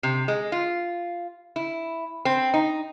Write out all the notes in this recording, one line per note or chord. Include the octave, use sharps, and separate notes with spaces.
C3
G#3
F4
E4
C4
D#4